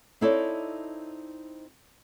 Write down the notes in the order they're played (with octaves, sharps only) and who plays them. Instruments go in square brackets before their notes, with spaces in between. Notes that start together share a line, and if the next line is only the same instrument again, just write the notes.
[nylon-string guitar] C4 D#4 E4 A4 C#5 D5